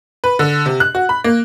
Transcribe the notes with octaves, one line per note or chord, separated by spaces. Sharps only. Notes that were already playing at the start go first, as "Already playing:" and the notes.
B4
D3
C3
F#6
F#4
B5
A#3